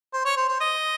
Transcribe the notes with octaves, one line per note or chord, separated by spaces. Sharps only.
C5
C#5
C5
C5
D#5